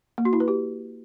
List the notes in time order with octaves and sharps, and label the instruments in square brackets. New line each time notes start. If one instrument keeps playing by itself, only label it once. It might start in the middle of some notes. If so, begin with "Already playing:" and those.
[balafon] A#3
F#4
E4
B4
G4